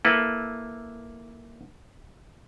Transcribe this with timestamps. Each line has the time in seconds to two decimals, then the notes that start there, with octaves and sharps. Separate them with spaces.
0.05 A#3 E4 A4 B4